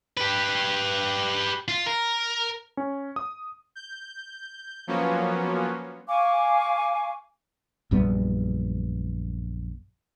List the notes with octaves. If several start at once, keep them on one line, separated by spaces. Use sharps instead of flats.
G4 B4
F4
A#4
C#4
D#6
G6
F3 F#3 A#3 B3 C#4
F5 G#5 C#6 D6
A#1 F#2 G3 B3